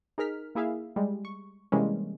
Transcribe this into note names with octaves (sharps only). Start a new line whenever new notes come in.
D#4 G#4 A#4 F6 B6
A#3 E4 G#4 E5 F5
G3 G#3
C#6
C3 E3 G3 G#3 A#3 C#4